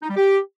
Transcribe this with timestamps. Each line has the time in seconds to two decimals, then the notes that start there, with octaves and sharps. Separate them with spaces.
0.02 D#4
0.09 G3
0.16 G4